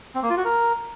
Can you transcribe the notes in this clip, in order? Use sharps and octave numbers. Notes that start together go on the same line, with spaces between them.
C4
A#3
F4
F#4
A#4